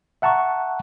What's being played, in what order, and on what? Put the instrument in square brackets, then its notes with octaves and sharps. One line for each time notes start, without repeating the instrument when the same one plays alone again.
[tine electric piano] E5 F#5 A5 A#5 C#6